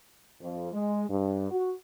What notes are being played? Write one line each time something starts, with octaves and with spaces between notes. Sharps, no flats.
F2
G#3
G2
F#4